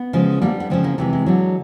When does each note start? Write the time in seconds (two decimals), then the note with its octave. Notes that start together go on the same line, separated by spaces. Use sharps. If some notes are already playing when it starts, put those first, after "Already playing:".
Already playing: B3
0.13 C#3 F3 G#3
0.42 D3 G3 A#3
0.60 B3
0.70 C#3 F3 G#3 C4
0.84 A#3
0.98 C3 E3 G#3 A3
1.13 G#3
1.26 D3 F#3